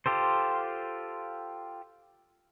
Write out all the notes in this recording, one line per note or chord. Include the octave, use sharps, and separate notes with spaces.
F4 G4 A4 C5